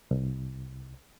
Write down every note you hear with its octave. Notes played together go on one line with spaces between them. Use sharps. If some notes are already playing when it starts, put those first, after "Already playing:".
C2